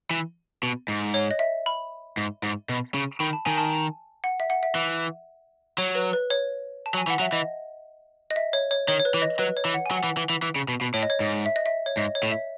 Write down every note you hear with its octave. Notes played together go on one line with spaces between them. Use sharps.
E3
B2
G#2
C#5
D#5
E5
B5
G#2
G#2
B2
C#3
D#3 B5
A5
D#3 G#5
A5
F#5
E5
F#5
E5
E3
F#3 C#5
B4
B4
C#5
A5
F#3
G#5
E3 F#5
F#3 E5
E3 D#5
D#5
E5
C#5
C#5
D#3 C#5
C#5
B4
E3
D#5
F#3 B4
C#5
E3
F#5
G#5
F#3
F#5
E3
E3
E3
E3
C#3
B2
B2
A2 C#5
D#5
C#5
G#2
E5
D#5
E5
C#5
G#2 D#5
C#5
A2
E5